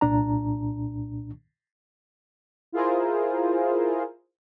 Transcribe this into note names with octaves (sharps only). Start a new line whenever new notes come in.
C2 A#2 D4 A#5
E4 F4 G#4 A#4 C5